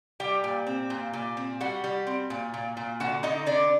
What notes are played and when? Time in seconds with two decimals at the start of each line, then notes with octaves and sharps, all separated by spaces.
0.20 G3 G4 G5
0.44 A#2
0.66 C4
0.90 A#2
1.13 A#2
1.37 C4
1.60 G3 F#4 F#5
1.84 G3
2.07 C4
2.30 A#2
2.54 A#2
2.77 A#2
3.00 D3 F#4 F#5
3.23 D3 D#4 D#5
3.46 D3 D4 D5